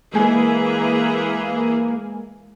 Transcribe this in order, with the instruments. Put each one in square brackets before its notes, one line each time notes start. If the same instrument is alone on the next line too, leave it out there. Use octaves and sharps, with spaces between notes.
[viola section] E3 G#4 [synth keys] G#3 G#5 [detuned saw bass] A#3